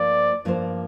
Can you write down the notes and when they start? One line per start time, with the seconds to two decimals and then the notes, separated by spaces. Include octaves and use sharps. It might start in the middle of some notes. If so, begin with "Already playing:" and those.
Already playing: G2 F3 A#3 F4 C5 D5
0.45 G2 F3 A#3 F4 C5